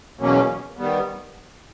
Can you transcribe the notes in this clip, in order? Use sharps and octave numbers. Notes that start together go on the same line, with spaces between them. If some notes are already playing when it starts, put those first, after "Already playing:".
E2 B2 F#3 A#3 C#4
D#3 G3 B3